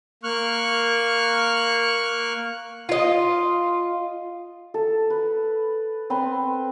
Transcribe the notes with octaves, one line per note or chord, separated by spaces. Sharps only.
A#3 C#6 F6 F#6
F4 D#5
A4
B4
C4 B4 C6